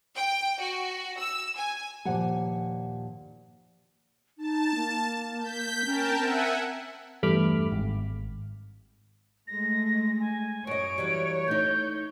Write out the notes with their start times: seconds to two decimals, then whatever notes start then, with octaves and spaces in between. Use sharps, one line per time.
0.15 G5
0.59 F#4
1.18 E6
1.55 G#5
2.05 D#2 A#2 F3 G4 F#5 G#5
4.38 D#4 A5
4.76 A#3
5.39 G6 B6
5.85 C#4 A#4 G5 A5
6.18 C4 E5 F#5 G#5
7.23 E2 G2 A3 B5 D6 F6
7.72 G#1
9.48 G#3 A3 A#6
10.19 G#5
10.67 F#2 C#5 D#5 D7
10.98 E3 F#3 G3
11.48 A3 D#4 G6